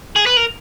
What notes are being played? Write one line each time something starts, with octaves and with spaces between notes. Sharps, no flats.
G#4
B4
A#4